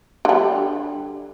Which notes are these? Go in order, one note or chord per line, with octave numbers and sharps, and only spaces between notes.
D3 G3